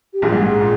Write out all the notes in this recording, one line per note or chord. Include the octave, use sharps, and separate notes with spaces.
G4
A#1 A#2 G#4
G#2
G#2
A#2